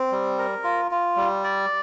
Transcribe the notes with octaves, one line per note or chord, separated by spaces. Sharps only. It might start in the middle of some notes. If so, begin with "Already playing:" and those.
Already playing: C4
G3
A#4
F4
F4
G3
D5